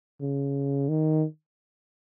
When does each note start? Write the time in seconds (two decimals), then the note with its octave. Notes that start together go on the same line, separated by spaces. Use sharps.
0.21 C#3
0.89 D#3